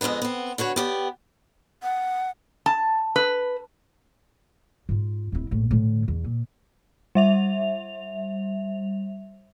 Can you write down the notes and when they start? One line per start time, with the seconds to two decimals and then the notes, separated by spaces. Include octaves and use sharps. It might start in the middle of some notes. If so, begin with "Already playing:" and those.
0.01 F2 G#3 B3 D4 B4
0.22 B3 C4
0.58 D3 F#4 B4 C#5
0.76 B3 G4 D5
1.83 F#5
2.66 A5
3.16 B4
4.89 G#2 F4
5.32 D1 E4
5.51 A#1 A2
5.71 A2 D3
6.08 E2
6.24 A#2
7.15 G3 E5 F7